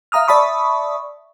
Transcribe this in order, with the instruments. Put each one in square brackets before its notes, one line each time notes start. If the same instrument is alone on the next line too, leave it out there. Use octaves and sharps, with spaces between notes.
[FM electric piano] E5 F5 A#5 D#6 F6
D5 E5 A5 B5 C#6 D#6